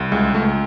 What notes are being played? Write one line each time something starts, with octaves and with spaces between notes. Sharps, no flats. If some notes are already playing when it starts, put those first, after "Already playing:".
Already playing: C2
C#2 G#3
C#2 A3